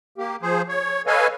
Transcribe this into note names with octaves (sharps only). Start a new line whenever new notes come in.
A#3 G4
F3 G#4 C5
C#5
A4 B4 C#5 D#5 F5 G#5